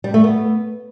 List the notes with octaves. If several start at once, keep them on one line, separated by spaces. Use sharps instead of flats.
G3
A3
B3